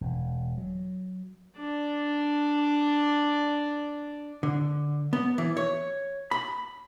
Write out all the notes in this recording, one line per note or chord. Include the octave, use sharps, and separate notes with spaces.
E1
F#3
D4 D5
D3
B3
E3
C#5
B5